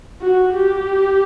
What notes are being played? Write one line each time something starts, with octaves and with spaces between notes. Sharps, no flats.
F#4
G4